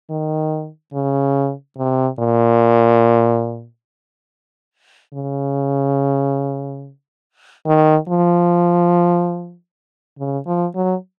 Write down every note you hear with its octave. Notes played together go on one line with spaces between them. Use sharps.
D#3
C#3
C3
A#2
C#3
D#3
F3
C#3
F3
F#3